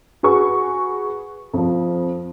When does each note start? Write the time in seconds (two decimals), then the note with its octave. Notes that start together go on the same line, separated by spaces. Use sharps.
0.23 F#4 G#4 B4 C#6
1.54 F2 F3